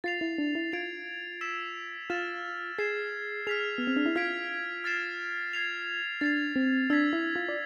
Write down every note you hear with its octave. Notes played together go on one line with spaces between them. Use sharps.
F4 A6 C7 F7
E4
D4
E4
F4 G#6 D7 F7
E6 B6 E7
F4 F6 A6 E7
G#4 G#6 C7 E7
G#4 F6 B6 F7
B3
C4
D4
E4
F4 F6 G#6 B6 D7
F6 A6 C7 E7
G#6 C7 F7
D4 A6 C7 F7
C4
D4 E6 G#6 B6
E4
F4
D5